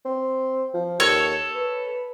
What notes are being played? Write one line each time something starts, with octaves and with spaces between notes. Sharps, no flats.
C4
F3
D#2 A4 C#5 C#6
B4